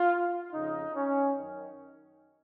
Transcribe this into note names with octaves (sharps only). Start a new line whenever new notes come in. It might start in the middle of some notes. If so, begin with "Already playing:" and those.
Already playing: F4
F2 C#3 D#4
C#4
F#2 D#3